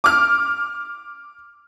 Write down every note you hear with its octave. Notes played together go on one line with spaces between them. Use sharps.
D6 F6